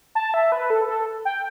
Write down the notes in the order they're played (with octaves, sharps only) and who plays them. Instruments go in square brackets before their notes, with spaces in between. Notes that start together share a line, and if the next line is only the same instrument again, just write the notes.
[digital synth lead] A5
E5
B4
A4
A4
G5